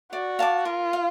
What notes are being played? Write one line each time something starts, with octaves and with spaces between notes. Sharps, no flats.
F#4 D5
F5 A5 D6
F4 A#4
F5